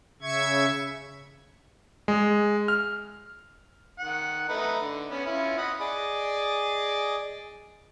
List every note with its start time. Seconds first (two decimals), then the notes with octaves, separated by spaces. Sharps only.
0.22 C#3 E5 C#6 G#6
2.08 G#3
2.68 F6
3.99 D#3 F#5
4.49 A3 D#4 B4
4.80 D3
5.10 B3 C#4
5.26 C#4 E4 F4
5.58 D#5 F#5 B5
5.80 G#4 D5 D#5